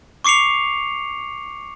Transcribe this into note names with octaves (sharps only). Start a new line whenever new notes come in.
C#6 D6 C7 C#7 F7